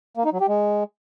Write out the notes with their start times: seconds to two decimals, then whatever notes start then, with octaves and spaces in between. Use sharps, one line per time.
0.17 A#3
0.25 D#4
0.33 F#3
0.41 G4
0.48 G#3